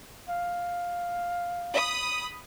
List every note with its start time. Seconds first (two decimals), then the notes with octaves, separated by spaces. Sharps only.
0.29 F5
1.73 B5 D#6